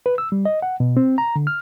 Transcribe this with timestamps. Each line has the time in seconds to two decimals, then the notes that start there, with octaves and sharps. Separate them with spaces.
0.06 B4
0.18 E6
0.32 G3
0.45 D#5
0.62 F#5
0.80 B2
0.97 C4
1.18 A#5
1.36 D3
1.47 F6